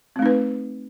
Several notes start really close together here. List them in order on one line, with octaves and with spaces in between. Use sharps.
C4 A3 D#4 B4